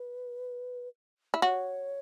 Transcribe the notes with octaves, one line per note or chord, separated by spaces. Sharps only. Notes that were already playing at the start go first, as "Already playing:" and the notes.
Already playing: B4
E4
F#4 C#5